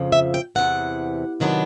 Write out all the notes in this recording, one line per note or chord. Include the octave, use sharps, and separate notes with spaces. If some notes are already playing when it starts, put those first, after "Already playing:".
Already playing: F2 C#3 F3
E5
G5
E2 C3 E3 F#5
C3 D#3 F#3 B3 D4